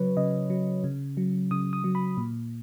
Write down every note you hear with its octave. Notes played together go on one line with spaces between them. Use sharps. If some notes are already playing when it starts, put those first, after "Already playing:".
Already playing: C#3 F#3 B4 C#5
C#3 D#5
F#3
C#3
F#3
C#3 D#6
D#6
F#3
B5
A#2